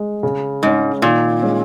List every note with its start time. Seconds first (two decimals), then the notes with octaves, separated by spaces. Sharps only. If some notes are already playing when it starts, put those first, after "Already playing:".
Already playing: G#3
0.23 C#3
0.63 G#2 G#3 C#4
1.02 A#2 D#3
1.42 G#3 C#4